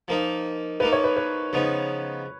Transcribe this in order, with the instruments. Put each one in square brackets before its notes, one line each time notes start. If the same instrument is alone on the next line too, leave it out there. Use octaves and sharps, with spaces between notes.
[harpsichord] F3 A#3 D#4
[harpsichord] F3 A#3 D#4 [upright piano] B4
[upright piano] C#5
B4
B4
[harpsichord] C#3 F3 B3 D#4